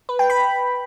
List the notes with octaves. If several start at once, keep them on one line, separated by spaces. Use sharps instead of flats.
B4
G5
B5